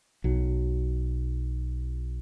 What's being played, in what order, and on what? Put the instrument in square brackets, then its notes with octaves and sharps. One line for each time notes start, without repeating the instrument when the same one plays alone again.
[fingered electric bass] B1 F#3